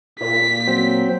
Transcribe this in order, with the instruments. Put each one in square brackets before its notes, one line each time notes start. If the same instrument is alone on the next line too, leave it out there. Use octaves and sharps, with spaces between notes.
[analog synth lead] A#2 [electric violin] B6
[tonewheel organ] F#3 [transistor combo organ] C4